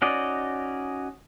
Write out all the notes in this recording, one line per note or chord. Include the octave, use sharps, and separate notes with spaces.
C#4 D#4 F#4 D5 D#5